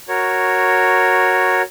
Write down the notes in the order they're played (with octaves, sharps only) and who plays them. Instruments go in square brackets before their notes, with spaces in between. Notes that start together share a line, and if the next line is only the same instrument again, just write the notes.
[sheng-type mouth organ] F#4 A#4 C#5